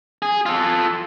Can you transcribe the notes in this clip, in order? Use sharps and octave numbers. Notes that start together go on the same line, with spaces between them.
G#4
F4 A4